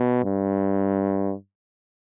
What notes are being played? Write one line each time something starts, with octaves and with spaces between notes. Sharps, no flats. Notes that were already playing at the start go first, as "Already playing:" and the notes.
Already playing: B2
G2